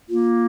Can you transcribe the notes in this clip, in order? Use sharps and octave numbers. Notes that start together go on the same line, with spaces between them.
A#3 F4